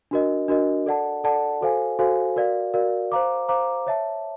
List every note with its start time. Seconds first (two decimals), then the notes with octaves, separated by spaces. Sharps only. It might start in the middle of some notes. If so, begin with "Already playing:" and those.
0.11 D4 F#4 A#4 D#5
0.48 D4 F#4 A#4 D#5
0.86 A4 D5 F#5 A5
1.24 A4 D5 F#5 A5
1.61 F#4 A4 C5 F5 G#5
1.99 F#4 A4 C5 F5 G#5
2.36 F#4 A#4 D5 F5
2.74 F#4 A#4 D5 F5
3.12 C5 F5 A#5 D6
3.49 C5 F5 A#5 D6
3.87 C#5 E5 A5